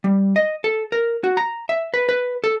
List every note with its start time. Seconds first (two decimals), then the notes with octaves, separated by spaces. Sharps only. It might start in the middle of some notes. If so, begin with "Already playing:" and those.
0.04 G3
0.36 D#5
0.64 A4
0.92 A#4
1.24 F#4
1.37 A#5
1.69 E5
1.94 B4
2.09 B4
2.44 A4